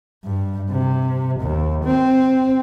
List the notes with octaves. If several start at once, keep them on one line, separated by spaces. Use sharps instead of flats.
G2
C3
D#2
C4